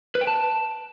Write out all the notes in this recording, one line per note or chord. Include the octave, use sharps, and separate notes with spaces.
B4
G5
A5